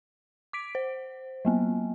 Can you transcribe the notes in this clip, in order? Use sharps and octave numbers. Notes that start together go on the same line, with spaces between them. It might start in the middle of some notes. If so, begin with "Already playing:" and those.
D6 B6 D7
C5
F#3 A#3 B3